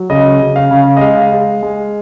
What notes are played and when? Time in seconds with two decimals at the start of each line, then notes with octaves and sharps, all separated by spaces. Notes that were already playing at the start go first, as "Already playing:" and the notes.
Already playing: F#3
0.10 C#3 D#5
0.41 C#3
0.56 F5
0.71 C#3
0.97 D#5
1.01 G#3 F5
1.32 G#3
1.63 G#3